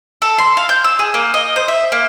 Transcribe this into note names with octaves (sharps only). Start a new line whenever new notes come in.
A4
C6
F5
G6
E6
G#4
A#3
D#5
C5
E5
A#3